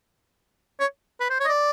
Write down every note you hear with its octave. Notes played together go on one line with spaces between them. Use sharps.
C#5
B4
C5
C#5
D#5
D5